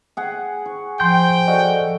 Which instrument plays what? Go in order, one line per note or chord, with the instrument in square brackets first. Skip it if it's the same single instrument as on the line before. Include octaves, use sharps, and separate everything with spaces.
[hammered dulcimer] G#4 F#5 G#5
C#6
[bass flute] F3 [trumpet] G5 [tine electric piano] C6 G6
[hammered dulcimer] F#4 A4 F#5 [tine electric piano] D5 D#5